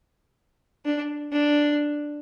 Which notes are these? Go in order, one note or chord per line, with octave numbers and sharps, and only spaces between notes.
D4
D4